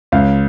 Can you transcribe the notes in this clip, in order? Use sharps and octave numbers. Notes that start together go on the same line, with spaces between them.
C#2 F5